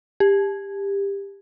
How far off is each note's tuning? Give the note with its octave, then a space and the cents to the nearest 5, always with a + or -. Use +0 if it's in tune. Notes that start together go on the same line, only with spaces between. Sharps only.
G4 +20